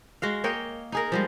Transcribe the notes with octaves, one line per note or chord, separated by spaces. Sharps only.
G#3 F#4 F5
A#3 C#5 D#5 G5
D#4 G#4 A#4
F3 G3 G#3